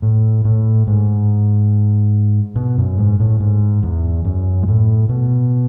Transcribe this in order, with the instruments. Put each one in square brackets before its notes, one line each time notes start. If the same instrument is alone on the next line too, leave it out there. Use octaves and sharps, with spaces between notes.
[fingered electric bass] A2
A2
G#2
B2
F#2
G#2
A2
G#2
E2
F#2
G#2
A2
B2